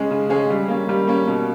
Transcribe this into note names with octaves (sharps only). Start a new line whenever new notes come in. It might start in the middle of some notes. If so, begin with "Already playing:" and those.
Already playing: C#3 G#3 C#4 G#4
C#3
G#3 C#4 G#4
G3
A#3 C#4
G3
A#3 C#4
B2